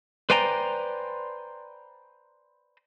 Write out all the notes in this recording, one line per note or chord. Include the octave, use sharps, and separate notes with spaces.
B4 C5 D5 G5 G#5 A#5